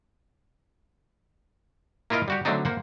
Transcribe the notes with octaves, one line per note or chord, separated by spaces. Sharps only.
A#3 E4 F4 A#4 D#5 F5
G3 F#4 G4
D3 F#3 A3 C4 D4 D#4
A#3 C5 F#5